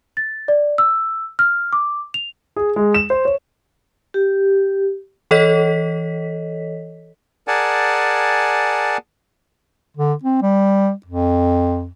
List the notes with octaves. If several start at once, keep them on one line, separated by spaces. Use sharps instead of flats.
A6
D5
E6
F6
D6
F7
G#4
G#3
E7
C5
C#5
G4
E3 A4 C#5 D#5 B6
G#4 A#4 D5 F#5 G#5 A5
D3
C4
G3
F2